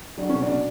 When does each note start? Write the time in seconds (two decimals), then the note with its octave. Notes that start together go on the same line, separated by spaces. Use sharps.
0.18 F#3 D4
0.29 B2 C#4
0.42 D4
0.49 B2